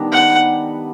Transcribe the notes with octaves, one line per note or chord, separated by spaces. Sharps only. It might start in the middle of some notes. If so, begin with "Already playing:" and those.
Already playing: D#3 G3 B3 D4
F#5